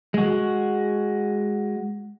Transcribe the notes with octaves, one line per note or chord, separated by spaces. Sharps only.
G#3 F#4